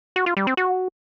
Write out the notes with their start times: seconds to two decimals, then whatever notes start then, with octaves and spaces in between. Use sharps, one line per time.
0.16 F#4
0.26 F4
0.37 G3
0.47 C4
0.57 F#4